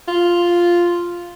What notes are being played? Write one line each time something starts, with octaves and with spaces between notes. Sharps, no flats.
F4